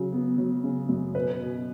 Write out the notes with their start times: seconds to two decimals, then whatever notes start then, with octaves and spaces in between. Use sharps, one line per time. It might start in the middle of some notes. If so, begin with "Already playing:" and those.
Already playing: C#3 F#3
0.13 B3
0.38 F#3
0.64 C#3
0.89 F#2
1.15 B2 B4
1.41 B2